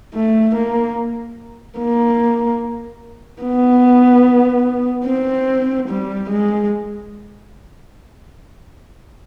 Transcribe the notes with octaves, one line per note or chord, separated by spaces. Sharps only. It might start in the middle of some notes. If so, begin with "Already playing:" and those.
A3
A#3
A#3
B3
C4
G3
G#3